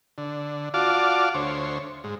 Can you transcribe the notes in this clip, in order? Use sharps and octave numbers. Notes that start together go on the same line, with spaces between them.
D3
F4 F#4 D5 F5 A5 D6
D2 C5 C#5
G#2